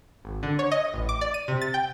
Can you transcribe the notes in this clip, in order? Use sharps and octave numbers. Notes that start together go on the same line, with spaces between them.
G#1
D3
C#5
D#5
A1
D6
D5
D#7
C3
A6
G5